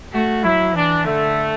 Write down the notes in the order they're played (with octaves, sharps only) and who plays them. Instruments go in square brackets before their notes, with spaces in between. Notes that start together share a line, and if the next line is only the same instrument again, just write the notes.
[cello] A3 [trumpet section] F#4
[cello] F#3 [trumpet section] E4
[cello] E3 [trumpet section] D4
[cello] D3 [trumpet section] A3